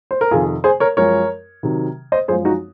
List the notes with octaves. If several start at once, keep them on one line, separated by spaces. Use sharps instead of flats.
C5
A#4
F2 C3 D#3 F4 G#4
G#4 C5
A#4 C#5
F#2 F3 G#3 A#4 C#5
C3 D#3 F#3
C5 D#5
F#2 F3 G#3 G#4 C5
D#4 F#4